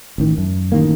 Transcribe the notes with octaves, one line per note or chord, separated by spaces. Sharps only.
A1 D#3
F#2
A1 D#3 A#3